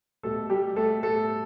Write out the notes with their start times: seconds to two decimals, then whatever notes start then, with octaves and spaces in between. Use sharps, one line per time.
0.23 B2 G3 A3 A4
0.50 G3 G4
0.76 A3 A4
1.03 A2 G3 A3 A4